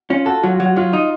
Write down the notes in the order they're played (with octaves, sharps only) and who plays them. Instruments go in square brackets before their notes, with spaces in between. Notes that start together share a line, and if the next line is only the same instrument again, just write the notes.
[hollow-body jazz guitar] C#4 [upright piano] F4
[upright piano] F#4 [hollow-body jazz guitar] A4
[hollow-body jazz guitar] F#3 [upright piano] F4
[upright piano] F#4
[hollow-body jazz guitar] F#3
[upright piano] F#4
[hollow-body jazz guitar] F#3 [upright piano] F4
[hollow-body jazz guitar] D#4